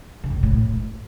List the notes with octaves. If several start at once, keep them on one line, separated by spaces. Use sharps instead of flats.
C#3
F2
B2
A2